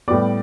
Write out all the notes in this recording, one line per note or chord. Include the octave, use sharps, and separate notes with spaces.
A2 G3 B3 D5 D6